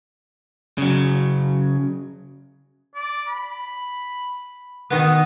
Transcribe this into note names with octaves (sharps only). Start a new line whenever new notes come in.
C#3 F#3
D5
B5
B2 D#3 B3 D#6